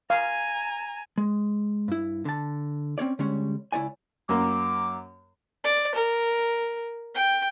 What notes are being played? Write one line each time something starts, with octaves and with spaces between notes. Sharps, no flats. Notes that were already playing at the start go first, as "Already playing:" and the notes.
F5 G#5 A#5
G#3
G2 E4
D3 A5
C4 C#4 C#5 D5
D3 G3 G#3 C#4 C#5
C#2 E4 C#5 D5 G#5
F#2 A#3 D6
D5
A#4
G5